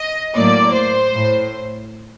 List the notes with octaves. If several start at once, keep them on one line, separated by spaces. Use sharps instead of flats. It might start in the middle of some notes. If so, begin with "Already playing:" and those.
Already playing: D#5
A2 F#3 A#3 D5
C5
A2